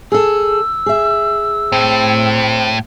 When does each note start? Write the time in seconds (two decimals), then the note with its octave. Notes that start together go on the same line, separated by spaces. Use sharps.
0.12 G#4 A4 E6
0.86 G#4 E5
1.72 A2 C4